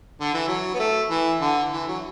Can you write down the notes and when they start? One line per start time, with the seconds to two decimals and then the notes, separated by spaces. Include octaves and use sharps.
0.21 D3
0.34 E3
0.48 F#3
0.74 B3
0.79 A3
1.10 E3
1.41 D3
1.73 E3
1.88 F#3